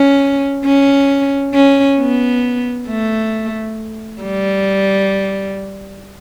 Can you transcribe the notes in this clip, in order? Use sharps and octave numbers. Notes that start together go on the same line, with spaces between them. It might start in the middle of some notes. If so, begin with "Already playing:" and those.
Already playing: C#4
C#4
C#4
B3
A3
G3